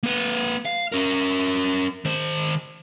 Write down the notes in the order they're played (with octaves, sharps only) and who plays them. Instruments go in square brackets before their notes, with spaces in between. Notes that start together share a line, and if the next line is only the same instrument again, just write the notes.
[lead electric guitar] A#3 B4
F5
C#4 A#4
D#3 C5